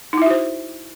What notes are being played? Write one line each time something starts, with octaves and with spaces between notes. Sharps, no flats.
D#4 E4 F#4 C5 E5